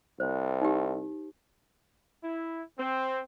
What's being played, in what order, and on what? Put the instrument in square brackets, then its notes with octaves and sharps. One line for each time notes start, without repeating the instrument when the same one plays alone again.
[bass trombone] C2 [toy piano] C5
[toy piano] D#4 G4
[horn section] E4
C4